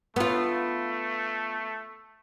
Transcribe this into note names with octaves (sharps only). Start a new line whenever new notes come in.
A3 B3 F4